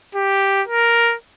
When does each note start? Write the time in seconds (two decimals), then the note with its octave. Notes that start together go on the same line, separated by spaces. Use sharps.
0.15 G4
0.68 A#4